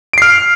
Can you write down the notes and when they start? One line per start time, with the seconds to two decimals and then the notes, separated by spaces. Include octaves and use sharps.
0.13 D7
0.18 C7
0.22 F6